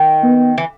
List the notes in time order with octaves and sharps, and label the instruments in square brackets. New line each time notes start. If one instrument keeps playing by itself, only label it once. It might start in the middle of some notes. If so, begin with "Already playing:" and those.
Already playing: [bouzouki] D#3
[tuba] B3
[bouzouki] E3